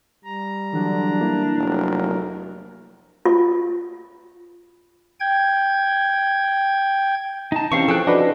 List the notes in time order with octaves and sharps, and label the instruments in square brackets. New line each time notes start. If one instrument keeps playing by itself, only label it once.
[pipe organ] G3 A#5
[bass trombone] D3 [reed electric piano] E3 F#3 [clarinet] D4
[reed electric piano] A#3 E4
[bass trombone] F1 [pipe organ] F#3 A#4
[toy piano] F4
[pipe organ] G5 G#6
[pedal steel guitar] D#4 A5 [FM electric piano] A#5
[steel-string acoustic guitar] E3 [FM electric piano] C4 C#4 [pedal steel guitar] G4 F5 C#6
[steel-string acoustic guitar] F3 [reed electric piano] G#4 [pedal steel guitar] A4 G5 F#6
[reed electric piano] D4 B4 [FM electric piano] F#4 F#5 [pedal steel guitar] D#5